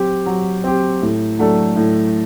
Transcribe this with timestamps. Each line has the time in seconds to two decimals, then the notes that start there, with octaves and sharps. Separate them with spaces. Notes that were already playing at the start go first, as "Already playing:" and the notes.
Already playing: F#3 C4 G4
0.26 F#3
0.64 C4 G4
1.02 A2
1.39 F#3 A3 D4 A4
1.76 A2